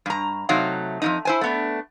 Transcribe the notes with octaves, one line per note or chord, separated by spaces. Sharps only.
G2 A#5
C3 F#3 A3 D#4 F5
F2 C#3 D#4
E4 C5 G#5
A3 B3 D4